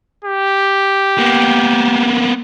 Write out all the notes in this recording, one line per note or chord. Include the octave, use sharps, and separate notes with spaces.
G4
A#3 B3